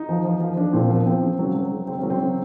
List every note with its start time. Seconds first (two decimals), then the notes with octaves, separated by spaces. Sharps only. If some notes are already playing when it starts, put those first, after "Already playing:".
Already playing: D#4
0.09 F3
0.25 F3
0.40 F3
0.57 F3 D4
0.73 A#2 C4
0.89 F3 B3
1.06 F3 C4
1.22 C#3
1.39 F#3
1.55 F#3
1.72 C#3
1.87 C#3 C4
1.99 F#3 C#4
2.10 C4
2.20 C#3